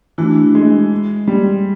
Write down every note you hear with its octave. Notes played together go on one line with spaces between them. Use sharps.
E3 A3 D4 F#4
G#3
G3